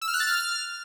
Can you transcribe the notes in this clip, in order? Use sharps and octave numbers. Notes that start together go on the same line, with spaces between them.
E6
F6
F#6
A6
F6